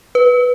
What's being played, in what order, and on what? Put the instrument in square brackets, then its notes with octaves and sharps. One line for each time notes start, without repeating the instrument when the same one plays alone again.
[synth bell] B4